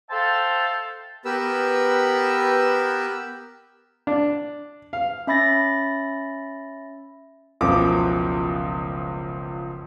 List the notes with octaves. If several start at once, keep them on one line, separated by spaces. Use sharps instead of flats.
A4 C5 E5 F5 G5 A5
B3 G4 A#4 B4 E6
D4
F5
C#4 E5 B5 A6 A#6
F#1 C#2 B2 F3 D6